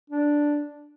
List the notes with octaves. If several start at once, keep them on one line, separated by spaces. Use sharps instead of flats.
D4